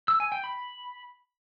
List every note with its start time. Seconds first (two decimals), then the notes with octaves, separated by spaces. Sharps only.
0.08 E6
0.20 G#5
0.32 G5
0.44 B5